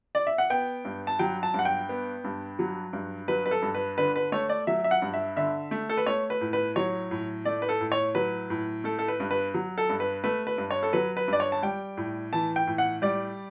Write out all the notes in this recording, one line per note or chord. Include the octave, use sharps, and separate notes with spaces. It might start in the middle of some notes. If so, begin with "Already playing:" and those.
D5
E5
F#5
B3 G5
G2
A5
F#3 G5
A5
G2 F#5
G5
B3
G2
F#3
G2
F#3 B4
B4
A4
G2
B4
D3 B4
B4
A3 C#5
D5
F#3 E5
E5
F#5
G2
E5
D3 E5
A3
A4
B4
A3 C#5
B4
A2
B4
F#3 C#5
A2
A3 D5
B4
A4
A2
C#5
F#3 B4
A2
A3 A4
A4
B4
G2
B4
F#3
A4
G2
B4
A3 B4
B4
G2
C#5
A4
F#3 B4
B4
G2 D5
C#5
A5
G3 G5
A2
E3 A5
G5
A2
F#5
G3 D5